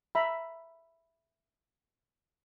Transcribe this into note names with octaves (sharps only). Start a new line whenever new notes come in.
E5 A#5 B5